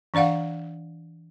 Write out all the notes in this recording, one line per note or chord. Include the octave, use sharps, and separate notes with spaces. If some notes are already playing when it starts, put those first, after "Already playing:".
E3 D4 D5 F5 F#5